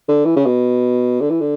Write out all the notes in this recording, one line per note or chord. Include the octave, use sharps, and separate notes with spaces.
D3
E3
C#3
B2
D3
E3
D3